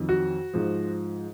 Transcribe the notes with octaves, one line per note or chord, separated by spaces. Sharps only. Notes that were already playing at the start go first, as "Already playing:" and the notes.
Already playing: F2 D#3 F#3
F#4
G#2 F3